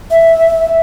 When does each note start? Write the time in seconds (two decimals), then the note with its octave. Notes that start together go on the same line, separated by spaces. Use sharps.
0.11 E5